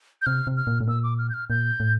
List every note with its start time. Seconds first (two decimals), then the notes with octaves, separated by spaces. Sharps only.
0.22 G6
0.26 C3 F6
0.47 C3
0.57 F6
0.67 A#2
0.81 A2
0.88 A#2 E6
1.03 D6
1.18 F6
1.30 G6
1.34 F6
1.50 A#2 G6
1.80 A2